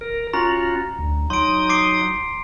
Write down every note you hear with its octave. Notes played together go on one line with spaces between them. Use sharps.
A#4
C#4 F4 F#4 A#5
D2
F#3 D#4 C6 D#6 D7
D6 C7 D7